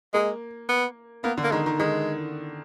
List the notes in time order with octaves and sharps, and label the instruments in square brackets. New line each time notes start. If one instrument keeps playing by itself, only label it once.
[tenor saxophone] G#3 [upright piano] A#3
[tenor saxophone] B3
[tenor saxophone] A#3 [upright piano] B3
[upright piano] D3
[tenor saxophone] A#3
[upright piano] D#3 [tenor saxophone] G#3
[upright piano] D#3
[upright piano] D#3 [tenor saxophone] G#3